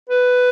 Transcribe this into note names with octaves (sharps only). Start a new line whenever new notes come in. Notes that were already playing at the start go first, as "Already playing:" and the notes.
B4